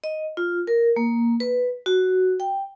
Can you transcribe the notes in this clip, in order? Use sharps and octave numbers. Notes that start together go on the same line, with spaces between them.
D#5
F4
A#4
A#3
B4
F#4
G5